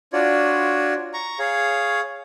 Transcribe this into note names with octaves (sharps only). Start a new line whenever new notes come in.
D4 F4 F#4 C#5 D5
A#5 C#6
G#4 C#5 F5